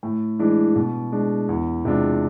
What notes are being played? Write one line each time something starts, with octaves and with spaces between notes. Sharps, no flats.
A2
E3 G#3 D4
B2
G#3 D4
E2
C3 G#3 D4 F4